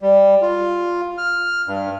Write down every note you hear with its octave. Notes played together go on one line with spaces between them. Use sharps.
G3
F4
F6
G2